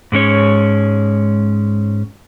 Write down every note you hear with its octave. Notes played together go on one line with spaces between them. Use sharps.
G#2 G#3 C#4 C#5